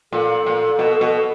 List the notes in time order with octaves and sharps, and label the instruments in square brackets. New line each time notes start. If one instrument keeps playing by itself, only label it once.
[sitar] A#2 [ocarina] A4
[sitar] A#2
B2
B2